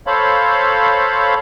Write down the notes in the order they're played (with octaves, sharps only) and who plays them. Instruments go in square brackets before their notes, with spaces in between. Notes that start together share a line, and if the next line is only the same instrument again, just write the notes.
[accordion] A4 C5 C#5 F5 B5